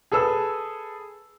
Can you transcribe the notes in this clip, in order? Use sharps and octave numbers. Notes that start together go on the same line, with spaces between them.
G#4 A4 B4 E6